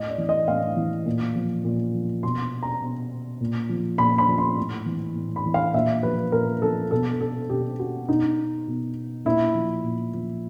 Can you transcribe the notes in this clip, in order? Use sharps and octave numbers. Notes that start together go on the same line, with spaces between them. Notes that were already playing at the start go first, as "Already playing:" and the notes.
Already playing: A2 D#5
D5
E3
D#5
A2 F5
E3
A#2
F3
A#2
F3
B2 C6
A#5
B2
A#2
F3
A#2 B5
B5
F3
C6
A2
E3
A2
B5
E3
F5
A#2 E5
F3 B4
A#2 A#4
F3 A4
B2 A4
A4
B2 G4
F#4
B2 D#4
B2
A#2 E4
F3
A#2
F3